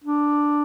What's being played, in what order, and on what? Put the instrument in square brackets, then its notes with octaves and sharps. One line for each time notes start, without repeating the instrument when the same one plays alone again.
[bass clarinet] D4